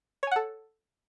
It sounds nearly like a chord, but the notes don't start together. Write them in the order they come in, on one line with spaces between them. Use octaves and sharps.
C#5 G#5 F#5 A4